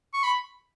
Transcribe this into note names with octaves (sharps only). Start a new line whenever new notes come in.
C#6
B5